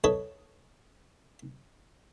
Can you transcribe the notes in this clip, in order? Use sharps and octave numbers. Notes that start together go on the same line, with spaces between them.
A4 B4 C#5 D#5